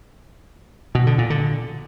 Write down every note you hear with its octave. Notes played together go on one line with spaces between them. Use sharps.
B2
D3
A#2
D3